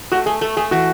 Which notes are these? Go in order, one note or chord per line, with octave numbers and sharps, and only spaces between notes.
A3 F#4
A3 G#4
A3 A4
A3 G#4
E3 F#4